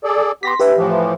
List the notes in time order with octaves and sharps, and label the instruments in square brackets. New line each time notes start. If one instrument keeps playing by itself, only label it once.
[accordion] G#4 A4 D5
[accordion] B3 G4 [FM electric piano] C6 A#6 B6
[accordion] D4 [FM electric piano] G4 B4 E5
[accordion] A2 E3 F3